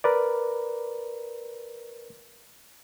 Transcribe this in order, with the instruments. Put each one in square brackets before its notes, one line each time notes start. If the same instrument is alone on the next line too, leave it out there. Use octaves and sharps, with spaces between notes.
[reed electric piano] A#4 B4 D5